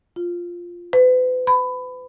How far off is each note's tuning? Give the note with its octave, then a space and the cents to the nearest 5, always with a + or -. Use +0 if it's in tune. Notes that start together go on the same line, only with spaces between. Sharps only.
F4 +0
B4 +40
B5 +20